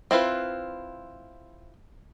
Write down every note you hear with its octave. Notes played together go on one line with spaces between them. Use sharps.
C4 E4 F4 B4